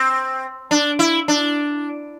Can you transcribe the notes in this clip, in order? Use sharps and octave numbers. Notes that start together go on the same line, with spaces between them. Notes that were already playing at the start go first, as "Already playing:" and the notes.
Already playing: C4
D4
E4
D4